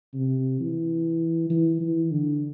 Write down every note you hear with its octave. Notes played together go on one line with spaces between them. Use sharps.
C3
E3
E3
E3
D3